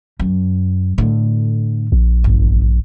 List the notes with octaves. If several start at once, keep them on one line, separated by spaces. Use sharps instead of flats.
F#2
A2 D3
A#1
G1